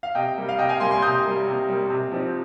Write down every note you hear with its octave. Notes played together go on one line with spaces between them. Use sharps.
F5
C3 D#5 G5
G3 A#3
F5
C3 D#5 G5
F5 G#5
G3 A#3 G#5 C6
G#5 C6
C3 D#6 G6
G3 A#3
C3
G3 A#3
C3
F3 C4 D#4